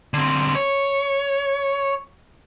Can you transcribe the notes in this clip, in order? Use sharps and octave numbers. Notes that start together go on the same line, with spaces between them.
D3 C4
C#5